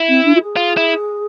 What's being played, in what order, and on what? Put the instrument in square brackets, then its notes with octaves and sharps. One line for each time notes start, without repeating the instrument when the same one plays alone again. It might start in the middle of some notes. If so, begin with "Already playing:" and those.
Already playing: [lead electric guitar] E4
[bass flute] C4
D4
F4
G#4
[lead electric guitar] F4
E4